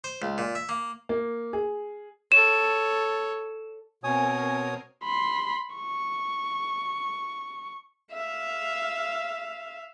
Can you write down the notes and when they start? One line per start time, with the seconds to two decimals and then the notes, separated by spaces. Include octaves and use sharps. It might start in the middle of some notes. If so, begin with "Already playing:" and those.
0.04 C5
0.22 C#2
0.38 A#2
0.55 E5
0.69 A#3
1.09 A#3
1.53 G#4
2.32 A4 C#5 E7
4.04 B2 C4 A#4 C#5 G#5 D#6
5.04 B5 C6
5.76 C#6
8.12 E5 F5